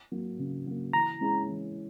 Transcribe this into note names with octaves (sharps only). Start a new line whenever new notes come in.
F#3 A#3
C#3
F#3 A#3
E3 A#5
G#3 C#4 E4 G#4
E3